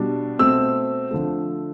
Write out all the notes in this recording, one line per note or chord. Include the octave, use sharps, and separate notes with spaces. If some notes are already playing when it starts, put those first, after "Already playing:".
Already playing: B2 G3 D4
B2 A3 C4 E6
D3 F3 A3